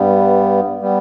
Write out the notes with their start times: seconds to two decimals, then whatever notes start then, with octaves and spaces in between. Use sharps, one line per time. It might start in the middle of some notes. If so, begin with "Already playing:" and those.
Already playing: G2 G3 B3
0.81 G3 B3